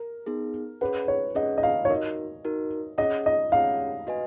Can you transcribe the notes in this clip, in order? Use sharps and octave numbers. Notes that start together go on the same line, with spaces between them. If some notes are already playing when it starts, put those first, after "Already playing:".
Already playing: A#4
B3 D#4 G#4
C#4 G#4 B4 C#5 F#5
C#5
C#4 G#4 C#5 D#5 F#5
D#5
F5
C#5
D#4 F#4 A#4 D#5
D#4 F#4 A#4
C#4 G#4 C#5 D#5 F#5
D#5
C#4 G#4 C#5 F5 F#5
F#4 B4 D#5 G#5